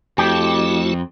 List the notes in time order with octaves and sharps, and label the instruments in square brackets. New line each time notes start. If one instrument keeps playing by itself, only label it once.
[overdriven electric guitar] F2 [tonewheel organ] A3 E4 F#4 [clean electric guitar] G4